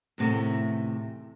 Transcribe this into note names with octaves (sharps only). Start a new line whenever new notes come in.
E2 A2 C3 D#3 A3